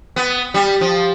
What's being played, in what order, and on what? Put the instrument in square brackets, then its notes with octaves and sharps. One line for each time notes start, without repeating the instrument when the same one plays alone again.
[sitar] B3
G3
F3